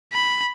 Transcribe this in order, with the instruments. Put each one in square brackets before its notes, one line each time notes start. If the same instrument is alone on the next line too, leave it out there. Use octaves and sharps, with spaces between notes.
[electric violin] B5